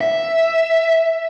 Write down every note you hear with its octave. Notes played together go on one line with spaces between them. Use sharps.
E5